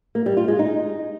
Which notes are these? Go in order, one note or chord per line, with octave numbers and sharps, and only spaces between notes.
A#3
G3
F4
G#3
D#4